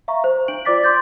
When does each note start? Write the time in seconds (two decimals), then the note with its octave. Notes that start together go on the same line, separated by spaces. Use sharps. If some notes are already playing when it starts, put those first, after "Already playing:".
0.08 E5 F5 A#5 C#6
0.24 C5
0.48 D4 D7 F#7
0.65 F4 C5 D5 D6 A6 B6
0.83 C6 D6 G6 A6